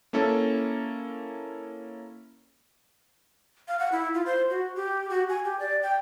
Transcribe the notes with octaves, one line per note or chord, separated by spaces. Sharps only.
A#3 C#4 E4 A4
F5
F#5
E4
F4
C5
F#4
G4
F#4
G#5
G4
D5
G5